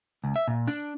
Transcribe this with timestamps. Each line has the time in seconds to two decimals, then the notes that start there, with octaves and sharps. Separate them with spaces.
0.24 C#2
0.36 E5
0.48 A#2
0.67 D4